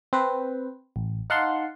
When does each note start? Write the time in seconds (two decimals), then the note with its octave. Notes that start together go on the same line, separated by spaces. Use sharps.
0.13 C4 B4 C5
0.96 A1
1.30 D#4 F5 F#5 A5 C6